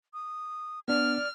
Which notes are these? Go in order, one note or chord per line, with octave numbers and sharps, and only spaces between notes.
D#6
B3 D4 D5 F6